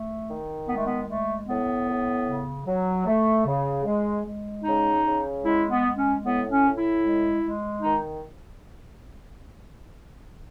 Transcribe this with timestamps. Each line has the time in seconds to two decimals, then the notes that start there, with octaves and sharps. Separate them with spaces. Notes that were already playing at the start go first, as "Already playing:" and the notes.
Already playing: A3
0.28 D#3
0.67 G#3 B3
0.77 A3
0.87 B3
1.07 G#3 A3
1.47 A2 B3
1.86 A2
2.26 C#3
2.65 F#3
3.06 A3
3.46 C#3
3.85 G#3
4.25 G#3
4.64 C#3 D#4
5.04 C#3
5.44 G#3 E4
5.71 B3
5.84 G#3
5.96 C#4
6.23 A2 B3
6.50 C#4
6.63 A2
6.77 E4
7.03 G#3
7.43 G#3
7.82 D#3 D#4